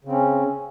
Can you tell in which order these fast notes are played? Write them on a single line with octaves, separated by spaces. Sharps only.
C#3 C4 C#4